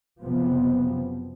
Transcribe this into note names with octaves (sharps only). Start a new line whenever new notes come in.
F#1 C3 F3 B3